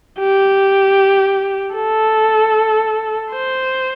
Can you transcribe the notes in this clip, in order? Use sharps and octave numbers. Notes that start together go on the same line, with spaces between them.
G4
A4
C5